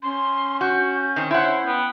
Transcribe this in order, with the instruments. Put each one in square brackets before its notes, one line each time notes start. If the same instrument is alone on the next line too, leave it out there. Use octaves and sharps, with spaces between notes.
[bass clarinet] C#4 [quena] C6
[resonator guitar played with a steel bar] F#4 [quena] G6
[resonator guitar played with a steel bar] D#3 C4
[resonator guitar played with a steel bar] E4 F#5 [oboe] C5 [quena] C#5
[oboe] B3 [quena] G5